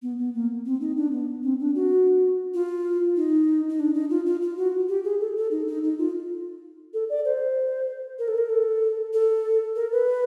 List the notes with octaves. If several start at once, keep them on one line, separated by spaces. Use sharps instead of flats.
B3
B3
A#3
C4
D#4
D4
B3
C4
D4
F#4
F4
D#4
D#4
D4
D#4
F4
F4
F4
F#4
G4
G#4
A4
A4
D#4
D#4
D#4
F4
A4
D5
C5
A#4
A4
A#4
A4
A4
A#4
B4